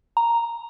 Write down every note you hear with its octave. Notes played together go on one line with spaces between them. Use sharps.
A#5